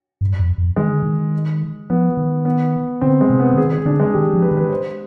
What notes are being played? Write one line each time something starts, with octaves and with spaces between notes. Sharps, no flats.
G2
F2
F2
D#3 G#3
D3
D#3
F3 B3
D#3
B3
D3 C4
G#3
C3
B3
D3
D#3 G#4
G#4
D3 D4
G#3
D#3 G4
F3
B4
D#3
B4
C5